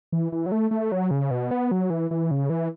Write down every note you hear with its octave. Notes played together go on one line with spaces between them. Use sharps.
E3
E3
F#3
A3
A3
F#3
C#3
B2
B3
F#3
E3
E3
C#3
E3